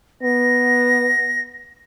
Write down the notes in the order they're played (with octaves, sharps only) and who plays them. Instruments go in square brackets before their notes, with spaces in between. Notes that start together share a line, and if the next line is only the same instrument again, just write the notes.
[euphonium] B3 [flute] A#6